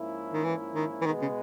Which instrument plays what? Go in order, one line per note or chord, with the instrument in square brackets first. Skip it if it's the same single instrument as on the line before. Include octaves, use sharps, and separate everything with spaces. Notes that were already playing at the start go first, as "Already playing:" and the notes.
Already playing: [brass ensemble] G#2 F3 A#3 C#4 E4
[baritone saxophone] D#3
E3
D#3
E3
[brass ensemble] B2 G#3 B3 [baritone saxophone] D#3
[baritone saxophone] C#3